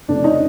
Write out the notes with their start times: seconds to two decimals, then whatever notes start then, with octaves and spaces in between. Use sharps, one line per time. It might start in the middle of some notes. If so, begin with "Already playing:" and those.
0.08 F1 F2 C#3 D4
0.24 C#4 D#4